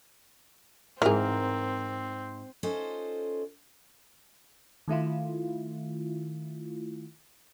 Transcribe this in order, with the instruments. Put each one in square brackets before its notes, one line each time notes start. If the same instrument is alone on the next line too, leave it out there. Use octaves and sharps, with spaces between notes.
[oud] G#2 A#4 [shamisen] E3 G#4 [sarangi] C4
[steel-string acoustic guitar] C#4 D#4 F4 A4 C5
[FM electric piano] D#3 A3 E4 F4